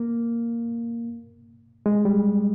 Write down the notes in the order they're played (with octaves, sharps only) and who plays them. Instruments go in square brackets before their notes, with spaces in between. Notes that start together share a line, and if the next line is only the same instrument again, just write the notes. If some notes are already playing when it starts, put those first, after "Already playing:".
Already playing: [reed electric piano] A#3
G#3
G3